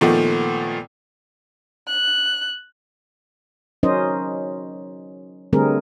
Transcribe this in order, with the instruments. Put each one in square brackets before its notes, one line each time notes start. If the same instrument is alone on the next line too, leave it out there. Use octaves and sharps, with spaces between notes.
[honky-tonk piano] A#2 D#3 F3 A3 B3
[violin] F#6
[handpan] F#3 C#4 D#4 A#4 C5 D#5
D3 G3 A3 C4 G#4 A#4